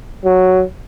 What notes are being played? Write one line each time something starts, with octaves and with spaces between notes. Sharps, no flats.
F#3